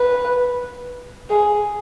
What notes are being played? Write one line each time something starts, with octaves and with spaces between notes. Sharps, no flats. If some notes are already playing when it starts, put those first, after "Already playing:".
Already playing: B4
G#4